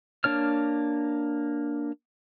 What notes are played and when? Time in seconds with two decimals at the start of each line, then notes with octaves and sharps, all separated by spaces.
0.24 A#3 D4 C#5 F6